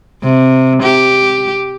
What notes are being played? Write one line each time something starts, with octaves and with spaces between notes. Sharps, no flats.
C3
G4